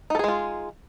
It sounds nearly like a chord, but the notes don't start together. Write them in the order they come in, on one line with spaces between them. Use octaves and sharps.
D#4 A4 G#4 G#3 F4